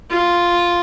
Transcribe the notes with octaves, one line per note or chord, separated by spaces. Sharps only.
F4